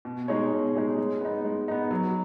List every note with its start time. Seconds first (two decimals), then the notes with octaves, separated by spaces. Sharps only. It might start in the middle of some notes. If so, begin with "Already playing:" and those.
0.05 B2
0.28 G#3 D#4 G#4 C#5
0.52 B2
0.75 G#3 D#4 G#4 C#5
0.98 G#3
1.21 B3 D#4
1.45 G#3
1.68 B3 D#4
1.91 F#3